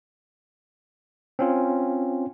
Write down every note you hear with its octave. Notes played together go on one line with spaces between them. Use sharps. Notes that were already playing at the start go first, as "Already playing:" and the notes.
C4 C#4 F4